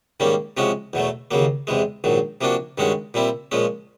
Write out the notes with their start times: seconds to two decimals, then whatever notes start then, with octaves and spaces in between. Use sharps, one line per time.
0.20 G#2 D#3 G3 A#3 C#4
0.57 C3 F3 G#3 C#4 F#4
0.93 E2 B2 F#3 A3
1.31 D#2 C#3 F#3 A#3
1.67 E2 C3 E3 G#3
2.04 A#1 G#2 D#3 F#3
2.41 C3 F3 A#3 D4 F#4
2.78 G2 D#3 G#3 C#4 F#4
3.14 A#2 G3 C4 E4
3.52 A#2 F3 G#3 C#4